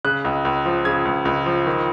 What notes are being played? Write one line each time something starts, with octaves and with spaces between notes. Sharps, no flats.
C#3 F#6
C#2
C#2
F3
C#3 G#6
C#2
C#2
F3
D#3